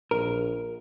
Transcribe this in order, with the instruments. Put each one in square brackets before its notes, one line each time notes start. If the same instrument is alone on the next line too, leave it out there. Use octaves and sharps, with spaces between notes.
[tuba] A#1 [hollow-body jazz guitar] A#4